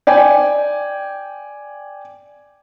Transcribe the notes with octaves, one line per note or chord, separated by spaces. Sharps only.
D5 G5 G#5